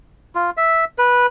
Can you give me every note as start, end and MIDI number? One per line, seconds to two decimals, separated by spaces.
0.35 0.50 65
0.57 0.85 76
0.98 1.26 71